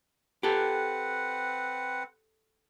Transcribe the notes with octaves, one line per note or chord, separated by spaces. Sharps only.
C4 G4 A4 B4 F#5